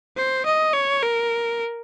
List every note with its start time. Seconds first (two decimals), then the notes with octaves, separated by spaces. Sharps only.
0.17 C5
0.46 D#5
0.73 C#5
1.02 A#4